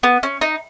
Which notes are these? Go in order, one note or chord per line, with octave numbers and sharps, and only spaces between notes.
B3
C#4
D#4